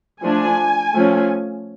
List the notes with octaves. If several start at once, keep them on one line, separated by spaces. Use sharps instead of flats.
F3 A3 D4 G#5
F3 A3 C#4